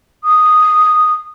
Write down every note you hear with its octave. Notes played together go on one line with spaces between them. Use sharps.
D#6